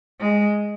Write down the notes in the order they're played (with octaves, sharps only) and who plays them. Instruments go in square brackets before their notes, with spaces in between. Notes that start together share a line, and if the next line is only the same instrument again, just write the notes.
[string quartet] G#3